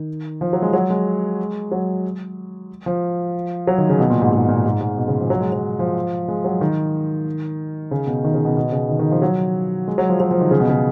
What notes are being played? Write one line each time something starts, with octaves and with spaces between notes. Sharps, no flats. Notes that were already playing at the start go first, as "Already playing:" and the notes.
Already playing: D#3
F3
F#3
G#3
F#3
G#3
F#3
F3
F#3
D#3
C#3
B2
A#2
G#2
G#2
A#2
G#2
G#2
B2
C#3
F3
F#3
G#3
F#3
F3
G#3
F#3
D#3
C#3
B2
D#3
C#3
B2
B2
C#3
D#3
D#3
F3
F#3
G#3
F#3
F3
F#3
F3
D#3
C#3
B2
C#3